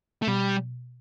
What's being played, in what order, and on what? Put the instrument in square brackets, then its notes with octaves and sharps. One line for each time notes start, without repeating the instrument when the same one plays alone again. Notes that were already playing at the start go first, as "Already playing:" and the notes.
[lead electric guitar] A3
[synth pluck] B2 [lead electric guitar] G3